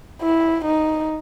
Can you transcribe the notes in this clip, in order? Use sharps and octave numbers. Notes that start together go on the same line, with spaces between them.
E4
D#4